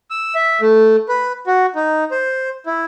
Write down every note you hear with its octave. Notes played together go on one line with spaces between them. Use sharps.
E6
E5
A3
B4
F#4
D#4
C5
E4